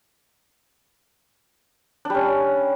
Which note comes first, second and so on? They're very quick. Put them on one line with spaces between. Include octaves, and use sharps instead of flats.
D4 G3 C#4